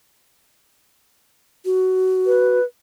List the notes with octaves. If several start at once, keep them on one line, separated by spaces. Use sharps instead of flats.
F#4
B4